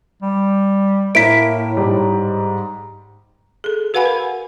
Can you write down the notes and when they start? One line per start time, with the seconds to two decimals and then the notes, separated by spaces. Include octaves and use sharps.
0.22 G3
1.15 A2 A#3 E4 B6 D7
1.77 G#2 G3
3.64 G#4 A4
3.94 F#4 B4 F5 F#5 G#5 B5
4.06 A#4